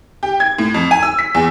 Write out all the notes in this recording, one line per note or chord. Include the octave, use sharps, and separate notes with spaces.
G4
G#6
A2
F2
G#5
E6
B6
E2